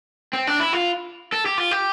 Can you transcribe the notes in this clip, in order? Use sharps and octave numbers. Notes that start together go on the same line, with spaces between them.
C4
D4
E4
F4
A4
G4
F4
G4